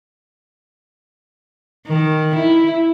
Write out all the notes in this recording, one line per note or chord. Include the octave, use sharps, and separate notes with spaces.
D#3
E4